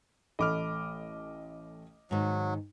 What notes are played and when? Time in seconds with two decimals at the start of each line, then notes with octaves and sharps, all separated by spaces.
0.39 A1 A3 D#5 B5 D6 F6
2.11 G#2 D#3 F#3